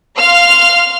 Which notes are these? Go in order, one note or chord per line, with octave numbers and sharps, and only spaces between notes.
F5 C6 F6